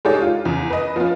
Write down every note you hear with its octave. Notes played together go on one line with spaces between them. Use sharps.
G#3 D4 D#4 G4 A4 C#5
F4
E2 C#3
B4 D#5
F3 B3 C#4 F4